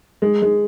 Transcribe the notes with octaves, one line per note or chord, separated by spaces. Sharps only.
G#3
G#3